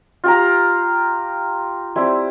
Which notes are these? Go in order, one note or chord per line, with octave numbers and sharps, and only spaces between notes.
F4 G4 A#5
G3 C4 E4